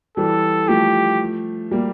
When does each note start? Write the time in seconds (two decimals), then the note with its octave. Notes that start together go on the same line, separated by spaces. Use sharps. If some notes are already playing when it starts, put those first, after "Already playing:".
0.17 E3 G3 A4
0.68 F3 A3 G4
1.71 G3 A#3